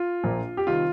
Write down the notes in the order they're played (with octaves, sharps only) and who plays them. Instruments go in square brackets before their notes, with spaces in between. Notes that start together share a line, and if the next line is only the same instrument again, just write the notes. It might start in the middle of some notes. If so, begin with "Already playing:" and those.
Already playing: [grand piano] F4
A#1 A#2 F3 A#3 D4
G4
C3 D#3 G3 F4